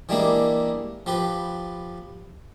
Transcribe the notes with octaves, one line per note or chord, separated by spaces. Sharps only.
E3 G3 G#3 A#3 D4
F3 G4 B4